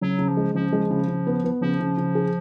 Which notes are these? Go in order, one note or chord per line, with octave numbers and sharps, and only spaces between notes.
C#3 F#3
C#3
F3
G#3
C#3 F3
G#3
C#3
C#3
B3
B3
C#3 F3
C#3
C#3
G#4